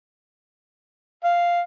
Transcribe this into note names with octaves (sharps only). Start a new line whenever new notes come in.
F5